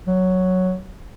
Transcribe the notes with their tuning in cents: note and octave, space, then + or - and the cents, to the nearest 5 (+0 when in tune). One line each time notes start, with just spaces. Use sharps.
F#3 +0